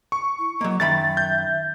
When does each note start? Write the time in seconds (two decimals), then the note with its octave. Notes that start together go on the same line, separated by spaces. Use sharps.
0.12 C#6
0.39 E4
0.61 F#3 A#3 D#5
0.80 F#2 D#3 E5 B5 A6
1.17 G6